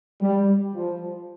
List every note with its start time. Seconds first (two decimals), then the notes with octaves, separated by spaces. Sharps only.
0.22 G3
0.75 F3